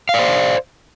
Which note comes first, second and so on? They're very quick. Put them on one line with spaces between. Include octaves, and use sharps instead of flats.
F5 D5 C5